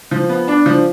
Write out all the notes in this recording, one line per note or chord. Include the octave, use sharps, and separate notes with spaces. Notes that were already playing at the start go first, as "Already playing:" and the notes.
F3
B3
D4
F3